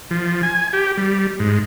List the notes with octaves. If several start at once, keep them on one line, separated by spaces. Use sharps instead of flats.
F3
G#5
G4
G3
G#2